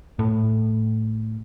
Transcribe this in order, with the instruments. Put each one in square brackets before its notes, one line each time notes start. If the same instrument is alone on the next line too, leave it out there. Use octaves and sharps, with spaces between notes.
[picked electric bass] A2